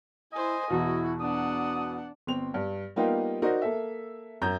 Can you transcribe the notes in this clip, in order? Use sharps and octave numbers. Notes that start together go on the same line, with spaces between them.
E4 C5 D#5 G#5
E2 B2 E4 F#4
B3 D4 F#5 D#6
G1 C4 F7
G2
G3 A#3 B3 D#4 F4 G4
D#4 F#4 A#4 C5 D5
A#3 A4 E5
F#2 A#5 G6